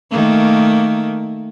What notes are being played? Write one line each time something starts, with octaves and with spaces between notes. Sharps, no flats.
D#3 A3 A#3